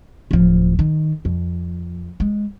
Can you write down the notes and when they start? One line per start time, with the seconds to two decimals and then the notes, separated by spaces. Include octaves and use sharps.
0.31 D1 F3
0.79 D#3
1.25 F2
2.20 G#3